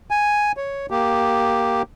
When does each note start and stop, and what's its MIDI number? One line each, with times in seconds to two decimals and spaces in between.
0.11 0.52 80
0.57 0.86 73
0.91 1.82 58
0.91 1.82 67